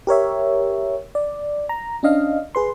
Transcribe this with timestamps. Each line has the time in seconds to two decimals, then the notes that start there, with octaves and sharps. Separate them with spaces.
0.07 G4 A#4 C#5 E5
1.15 D5
1.69 A#5
2.03 C#4 D4 D#5 F5
2.55 G#4 B4 C6